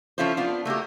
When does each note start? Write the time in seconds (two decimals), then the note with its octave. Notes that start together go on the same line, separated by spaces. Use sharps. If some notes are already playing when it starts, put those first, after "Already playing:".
0.18 F3 C#4 E4 F4 A4 C5
0.37 B3 D4 F4
0.65 A3 A#3 F#4 G4